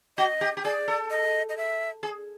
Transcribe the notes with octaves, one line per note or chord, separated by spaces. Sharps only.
F#4 D#5
G4
G4
G#4 D5
A4
D#5
D#5
E5
G#4